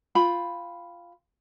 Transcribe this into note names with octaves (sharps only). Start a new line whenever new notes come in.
F4 G5 B5